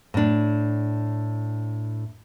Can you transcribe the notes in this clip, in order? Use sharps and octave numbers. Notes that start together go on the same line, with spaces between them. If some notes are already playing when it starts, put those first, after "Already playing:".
A2 D4